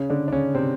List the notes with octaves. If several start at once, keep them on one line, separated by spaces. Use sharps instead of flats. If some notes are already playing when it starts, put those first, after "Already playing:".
Already playing: C#3 C#4
D3 D4
D4
C#3 C#4
C3 C4